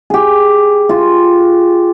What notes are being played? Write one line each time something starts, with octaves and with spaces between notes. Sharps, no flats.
G4 G#4
F4